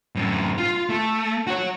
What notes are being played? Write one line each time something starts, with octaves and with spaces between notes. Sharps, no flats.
F#2 A2
F4
A3
F#4 C#5